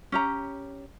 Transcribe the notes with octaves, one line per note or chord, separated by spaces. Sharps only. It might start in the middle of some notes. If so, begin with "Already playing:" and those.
C#4 G4 A#5